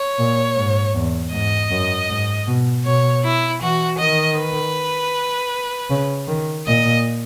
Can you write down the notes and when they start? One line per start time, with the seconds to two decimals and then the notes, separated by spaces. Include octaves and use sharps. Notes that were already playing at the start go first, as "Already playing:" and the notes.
Already playing: C#5
0.19 A#2
0.57 G#2
0.95 E2
1.33 G#2 D#5
1.71 F#2
2.09 G#2
2.48 B2
2.85 B2 C#5
3.24 E4
3.62 E3 F#4
3.99 D#3 D#5
4.38 B4
5.90 C#3
6.28 D#3
6.67 A#2 D#5